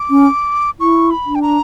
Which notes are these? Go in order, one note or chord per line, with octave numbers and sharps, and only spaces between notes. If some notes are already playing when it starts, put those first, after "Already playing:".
Already playing: D6
C#4
E4 C#6
B5
D4
G5
A#5